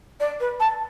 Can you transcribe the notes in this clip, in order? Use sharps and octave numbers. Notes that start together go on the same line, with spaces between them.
D5
B4
A5